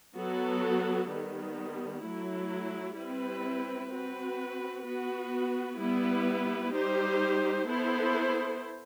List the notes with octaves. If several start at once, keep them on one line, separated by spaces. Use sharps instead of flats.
F#3 B3 F#4 A4
D#3 G3 B3
F#3 A3 E4
G3 C4 E4 B4
C4 F#4 B4
B3 F#4 B4
G3 B3 E4 B4
G3 D#4 G4 C5
B3 E4 A4 C5